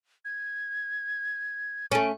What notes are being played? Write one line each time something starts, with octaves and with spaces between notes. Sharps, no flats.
G#6
A3 C#4 D7